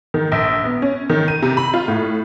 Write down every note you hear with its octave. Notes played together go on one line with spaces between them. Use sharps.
D#3
A#1
B3
C#4
D#3
D#7
C3
B5
F4
A2